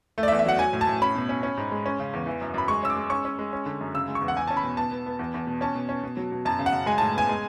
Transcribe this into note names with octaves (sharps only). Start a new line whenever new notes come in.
A3
D5
E5
E2
E5
F#3 F#5
F#3 G#5
A2
A5
A2
C#4 B5
B2
C#4
C#4
G#2
G#3
C#4
C#3
E2
E3
F#2
F#2 B5
G#3 C#6
C#4 E6
D6
G#3
C#4 C#6
C#4
G#3
C#4
D3
F#2
C#3 E6
G#3
C#6
E2
F#5
E2 G#5
C#4 A5
B5
B2
B3 A5
B3
B3
E2
E2
B2
C#4 A5
B2
C#4
B2
F#3
B2
F#2 A5
C#3
F#5
F#2
G#3 G#5
A2 A5
B3 G#5
G#3